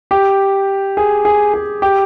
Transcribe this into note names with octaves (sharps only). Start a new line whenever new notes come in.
G4
G#4
G#4
G#4
G4